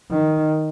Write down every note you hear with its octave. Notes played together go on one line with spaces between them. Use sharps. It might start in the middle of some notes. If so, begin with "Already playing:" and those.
D#3